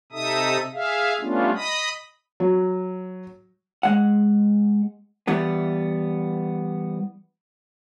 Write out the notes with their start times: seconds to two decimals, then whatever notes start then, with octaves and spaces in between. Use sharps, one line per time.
0.12 C3 D#4 A4 E5 D#6
0.73 G#4 E5 F5
1.21 G3 A3 B3 C#4 D4 F4
1.55 D#5 B5 D#6
2.40 F#3
3.83 G#3 F#5
5.27 E3 G3 B3